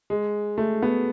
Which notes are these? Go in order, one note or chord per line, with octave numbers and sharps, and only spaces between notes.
G#3
A3
B3